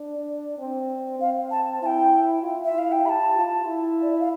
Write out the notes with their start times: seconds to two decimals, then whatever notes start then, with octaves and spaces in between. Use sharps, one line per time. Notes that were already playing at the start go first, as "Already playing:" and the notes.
Already playing: D4
0.59 C4
1.20 C4 F5
1.51 A5
1.82 E4 G5 A5
2.43 F4
2.65 E5
2.74 E4 F5
2.92 G5
3.05 G4 B5
3.09 A5
3.36 F4
3.66 E4
4.02 D5
4.11 E5
4.20 F5